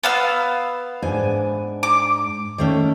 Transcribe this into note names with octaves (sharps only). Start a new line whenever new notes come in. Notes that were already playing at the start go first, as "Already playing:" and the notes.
B3 F5 E6
G#2 D4 G#5
D6
D#3 A3 C#4